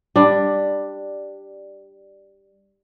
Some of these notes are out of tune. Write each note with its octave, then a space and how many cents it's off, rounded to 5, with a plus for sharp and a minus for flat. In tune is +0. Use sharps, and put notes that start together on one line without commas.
G3 +0 D4 +10